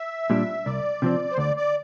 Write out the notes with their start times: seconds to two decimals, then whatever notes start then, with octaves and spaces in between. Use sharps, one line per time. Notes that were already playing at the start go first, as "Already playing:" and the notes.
Already playing: E5
0.30 A#2 G3 D4
0.65 C2 D5
1.02 C3 F3 C4
1.31 C5
1.38 D2 D5
1.57 D5